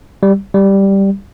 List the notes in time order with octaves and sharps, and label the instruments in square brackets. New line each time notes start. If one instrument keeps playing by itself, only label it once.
[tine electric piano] G3
G3